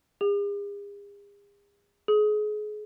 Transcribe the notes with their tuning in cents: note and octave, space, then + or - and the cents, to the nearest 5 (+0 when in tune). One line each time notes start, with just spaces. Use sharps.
G#4 -45
G#4 +30